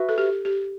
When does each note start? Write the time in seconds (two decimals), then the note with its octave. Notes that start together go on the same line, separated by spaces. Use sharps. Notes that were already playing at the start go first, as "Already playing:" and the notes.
Already playing: F#4 B4 E5
0.09 A4
0.18 G4
0.45 G4